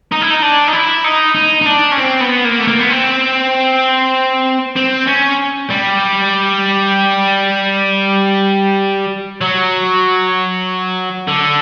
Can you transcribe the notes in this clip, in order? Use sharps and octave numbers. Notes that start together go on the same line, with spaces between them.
D#4
E4
D#4
D4
D#4
E4
D#4
D#4
D#4
D4
C#4
C4
B3
A#3
A3
A#3
B3
C4
C4
C#4
G3
F#3
D3